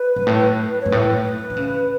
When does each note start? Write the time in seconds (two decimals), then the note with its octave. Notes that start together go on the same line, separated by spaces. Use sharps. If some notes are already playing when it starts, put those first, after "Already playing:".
Already playing: B4
0.16 G2
0.27 A2
0.81 G2 C#5
0.92 A2 B4
1.50 D3
1.57 C#3